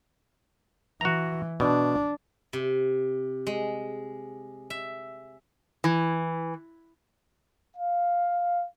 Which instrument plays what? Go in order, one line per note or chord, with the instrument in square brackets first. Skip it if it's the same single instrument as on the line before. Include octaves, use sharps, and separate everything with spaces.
[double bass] E3 [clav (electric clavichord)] F#4 A#5
[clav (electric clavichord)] B2 [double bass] D4
[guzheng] C3
G#3
E5
[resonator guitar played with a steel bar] E3
[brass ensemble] F5